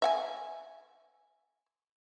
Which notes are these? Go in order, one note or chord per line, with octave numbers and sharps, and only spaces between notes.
E5 F#5 G#5